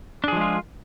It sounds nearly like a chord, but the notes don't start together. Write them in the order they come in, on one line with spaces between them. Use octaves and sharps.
D4 G#4 F3 G#3 F4